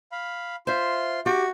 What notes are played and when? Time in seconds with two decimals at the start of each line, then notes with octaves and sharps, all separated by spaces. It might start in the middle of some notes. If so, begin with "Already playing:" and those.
0.12 F5 B5
0.67 F4 C5 E5 C6
1.26 F#4 G4 D6